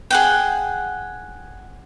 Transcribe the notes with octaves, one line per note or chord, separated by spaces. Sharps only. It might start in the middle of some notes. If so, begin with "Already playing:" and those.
G#4 F#5 G5